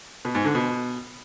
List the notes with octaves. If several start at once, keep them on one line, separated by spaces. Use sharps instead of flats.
B2
G#2
D3
B2